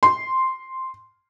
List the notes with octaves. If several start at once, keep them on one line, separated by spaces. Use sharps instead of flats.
C6